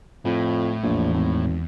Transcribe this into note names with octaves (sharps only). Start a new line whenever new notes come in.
F2 A2
A#1 E2
G#1